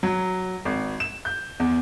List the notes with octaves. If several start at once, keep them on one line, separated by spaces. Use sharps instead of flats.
F#3
G#1
E7
G6
E2